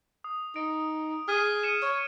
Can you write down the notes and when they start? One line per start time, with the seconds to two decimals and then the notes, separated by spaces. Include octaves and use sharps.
0.24 D#6
0.56 D#4 D7
1.28 G#4 F6 G#6 D#7
1.63 C#7 D#7 E7
1.82 C#5